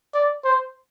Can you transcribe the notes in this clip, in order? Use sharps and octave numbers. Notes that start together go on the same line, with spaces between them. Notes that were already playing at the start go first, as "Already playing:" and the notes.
D5
C5